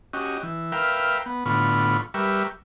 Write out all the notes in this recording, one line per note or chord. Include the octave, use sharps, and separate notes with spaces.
C#4 F#4 G4 D#5
E3
A#4 B4 E5 F5 G5
B3
A2 D3 B3 F4 B5 C#6
G3 G4 A#4 B4 E5 C#6